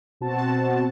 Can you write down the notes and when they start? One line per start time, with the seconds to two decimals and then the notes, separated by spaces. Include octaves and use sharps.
0.21 B2 C4 F#4 A5